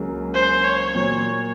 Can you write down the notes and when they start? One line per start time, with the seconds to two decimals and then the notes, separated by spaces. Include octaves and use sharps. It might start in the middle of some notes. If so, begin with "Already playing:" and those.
Already playing: C#2 C#3 F#3 A#3 C#4
0.34 C5
0.64 C#5
0.95 A#2 F#3 A#3 C#5